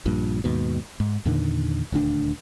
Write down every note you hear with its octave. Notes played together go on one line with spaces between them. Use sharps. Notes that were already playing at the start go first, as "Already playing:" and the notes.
A#1 G2 A#2
D#2 G#2 B2
G#2
E2 A#2 D3 D#3
D#1 D2 D4